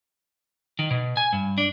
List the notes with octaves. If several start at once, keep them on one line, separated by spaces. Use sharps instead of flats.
D#3
B2
G#5
G2
D4